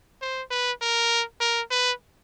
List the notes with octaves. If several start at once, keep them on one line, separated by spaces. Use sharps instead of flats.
C5
B4
A#4
A#4
B4